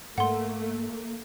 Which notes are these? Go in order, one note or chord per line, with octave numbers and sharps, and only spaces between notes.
G#2 A3 A#3 F#5 C6